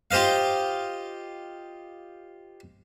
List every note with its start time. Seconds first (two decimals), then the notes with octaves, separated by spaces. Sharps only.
0.11 F4 G4 C5 D#5 F5